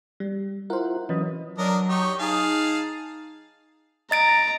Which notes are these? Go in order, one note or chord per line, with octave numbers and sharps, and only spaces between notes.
G3
E4 F4 A#4 C5 F#5
E3 F#3 C#4 B4 D#5
F#3 D4 A#4 D#5
D#4 G4 C#6
D#4 G#4 F5 A5
D#5 A#5 A6 D7